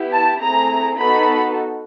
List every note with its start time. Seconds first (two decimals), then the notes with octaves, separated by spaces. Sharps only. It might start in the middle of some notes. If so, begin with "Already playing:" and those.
Already playing: B3 E4 G4
0.12 A5
0.41 A3 C4 E4 G#4 A#5
0.99 B3 D#4 F#4 A4 B5